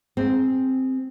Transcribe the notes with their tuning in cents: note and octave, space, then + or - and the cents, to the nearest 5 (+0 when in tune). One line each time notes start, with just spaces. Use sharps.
C4 +0 G#4 +0